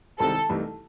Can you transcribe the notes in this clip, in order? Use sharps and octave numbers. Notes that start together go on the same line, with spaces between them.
C2 C3 D#3 G#3 C4 A4
C2 C3 E3 A3 D#4